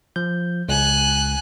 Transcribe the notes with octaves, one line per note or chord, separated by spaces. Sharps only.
F3 G6
C#2 G#5 F#6